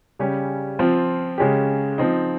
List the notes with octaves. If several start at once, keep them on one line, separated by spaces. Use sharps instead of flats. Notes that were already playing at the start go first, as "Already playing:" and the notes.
C#3 G3 C#4 G4
F3 C4 F4
C#3 G#3 C#4 G4
F3 C4 D#4